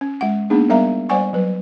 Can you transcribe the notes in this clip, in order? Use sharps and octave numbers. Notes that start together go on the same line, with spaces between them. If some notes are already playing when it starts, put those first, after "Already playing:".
C#4
G#3 F#5
A#3 B3 D4 D#4 G#4
G3 B3 A#4 E5 F5 A#5
G3 C5 D5 F#5 G#5 C#6
F#3 B4